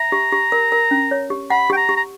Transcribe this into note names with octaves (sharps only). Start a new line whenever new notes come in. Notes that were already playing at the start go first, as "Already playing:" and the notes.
Already playing: E5 A#5
G4
G4
A#4
A#4
C#4
C#5
G4
F#5 B5
G4 G5
A#5
G4
A#5